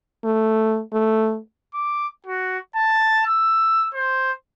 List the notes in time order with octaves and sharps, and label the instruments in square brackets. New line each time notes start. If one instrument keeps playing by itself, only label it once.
[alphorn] A3
A3
[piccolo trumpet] D6
F#4
A5
E6
C5